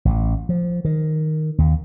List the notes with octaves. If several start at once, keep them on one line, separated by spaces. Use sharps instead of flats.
A1
F3
D#3
D#2